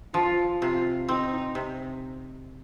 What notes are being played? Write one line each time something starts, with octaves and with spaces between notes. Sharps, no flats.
F3 F4
C3 F4
C4 D#4
C3